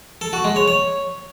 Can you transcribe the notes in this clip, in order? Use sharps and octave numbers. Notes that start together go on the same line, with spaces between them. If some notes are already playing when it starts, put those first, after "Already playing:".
A4
F#4
G#3
C#5
C#5